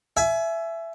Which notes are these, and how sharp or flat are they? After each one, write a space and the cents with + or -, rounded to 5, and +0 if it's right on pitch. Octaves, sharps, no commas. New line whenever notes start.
E5 +15 G#5 +30